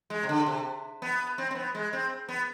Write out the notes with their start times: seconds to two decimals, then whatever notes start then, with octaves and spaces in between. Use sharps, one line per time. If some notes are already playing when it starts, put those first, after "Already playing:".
0.10 G#3
0.23 C3
0.29 D3
0.46 C3
1.02 B3
1.38 C4
1.51 C4
1.55 B3
1.75 G#3
1.93 C4
2.29 B3